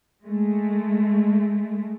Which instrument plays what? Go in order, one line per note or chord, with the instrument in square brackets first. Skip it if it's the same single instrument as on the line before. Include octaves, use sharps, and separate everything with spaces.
[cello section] G#3 A3